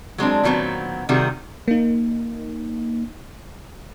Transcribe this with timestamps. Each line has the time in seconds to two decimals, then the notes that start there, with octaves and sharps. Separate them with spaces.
0.18 F#3 G#3 C4 D4
0.43 A#2 D#3 F#3 G3 B3 C4
1.09 C3 D#3 G3 F#4 G#4
1.68 A#3 D#4